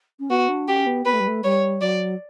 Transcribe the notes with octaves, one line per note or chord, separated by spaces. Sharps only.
C#4
B3 F#4
D4
C#4 G4
B3
B3 B4
A3
G3
A3
G3 C#5
F#3 D5